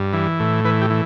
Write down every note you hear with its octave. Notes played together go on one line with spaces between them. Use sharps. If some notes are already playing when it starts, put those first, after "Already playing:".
Already playing: G2
E3
A2
E3 B4
G4
E3